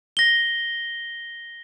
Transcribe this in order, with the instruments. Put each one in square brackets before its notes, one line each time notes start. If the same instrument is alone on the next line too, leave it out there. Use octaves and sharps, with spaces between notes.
[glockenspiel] A#6 G7